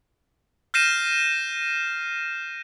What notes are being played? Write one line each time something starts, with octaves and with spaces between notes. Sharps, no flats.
F6 G6 A#6 C7 D#7 E7